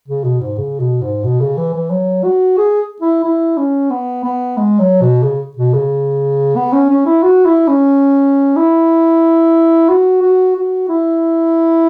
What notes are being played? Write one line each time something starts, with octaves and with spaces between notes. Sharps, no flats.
C#3
B2
G#2
C#3
B2
G#2
B2
C#3
E3
E3
F#3
F#4
G#4
E4
E4
C#4
B3
B3
G#3
F#3
B2
C#3
B2
C#3
B3
C#4
C#4
E4
F#4
E4
C#4
E4
F#4
F#4
F#4
E4